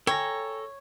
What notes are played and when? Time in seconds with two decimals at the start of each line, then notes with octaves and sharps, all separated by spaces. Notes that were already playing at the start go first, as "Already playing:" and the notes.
0.07 A4 C#5 G5 G#5 A#5